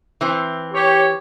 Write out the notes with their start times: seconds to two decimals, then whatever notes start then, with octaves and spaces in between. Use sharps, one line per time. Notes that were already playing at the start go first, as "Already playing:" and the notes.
0.21 E3 C4
0.74 G4 C#5